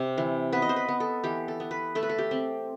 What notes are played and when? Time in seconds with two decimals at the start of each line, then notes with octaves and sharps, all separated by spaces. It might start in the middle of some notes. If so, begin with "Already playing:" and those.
Already playing: C3
0.18 E3
0.53 B3 B4
0.62 D#5
0.69 C5
0.76 B4
0.89 B3
1.00 A4
1.24 E3 G4
1.48 A4
1.60 B3
1.71 B4
1.95 A3 A4
2.03 B4
2.09 A4
2.18 G4
2.31 C4